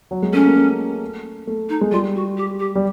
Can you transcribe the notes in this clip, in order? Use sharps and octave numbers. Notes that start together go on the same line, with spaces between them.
F#3
G#3
A3 C#4
A#3
A3
A3
D#4
G#3
G3 F4
F#4
G4
G4
G3